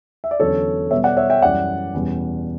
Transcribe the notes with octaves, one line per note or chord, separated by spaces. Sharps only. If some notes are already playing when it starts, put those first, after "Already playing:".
E5
D5
E2 D3 F#3 C#4 A4 C#5
B2 G3 B3 C#5 E5
D5 F#5
C#5 E5
E5 G5
F#2 E3 G3 C#4 D5 F#5
E2 B2 G3 C#4